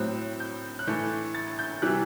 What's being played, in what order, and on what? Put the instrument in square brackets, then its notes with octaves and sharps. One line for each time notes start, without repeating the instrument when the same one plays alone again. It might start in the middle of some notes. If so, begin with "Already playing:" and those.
Already playing: [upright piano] A2 F#3 C4 F#6
G6
F#6
A2 E3 A3 G6
A6
G6
C3 E3 G3 F#6